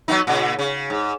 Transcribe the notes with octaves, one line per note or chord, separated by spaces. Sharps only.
F#3 B3 D#4
A#2 C#3
C#3
G#2